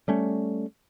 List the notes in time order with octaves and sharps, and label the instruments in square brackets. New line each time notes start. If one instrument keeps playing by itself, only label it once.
[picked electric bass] G3 A3 C#4